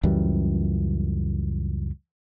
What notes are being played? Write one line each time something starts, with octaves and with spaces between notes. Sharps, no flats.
C#2 F#2 E3 G3